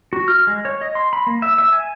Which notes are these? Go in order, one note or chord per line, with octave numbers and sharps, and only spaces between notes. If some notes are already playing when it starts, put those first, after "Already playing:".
F#4
F6
G#3
C#5
D#5
C6
B5
A#3
E5
E5
G#5